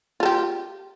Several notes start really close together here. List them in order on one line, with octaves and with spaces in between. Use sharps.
F4 A4 G4